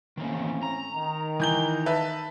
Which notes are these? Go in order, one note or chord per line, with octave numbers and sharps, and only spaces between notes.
A2 D#3 E3 A#3 C4 C#4
A#5
D#3
E3 G6 G7
B4 E5 A5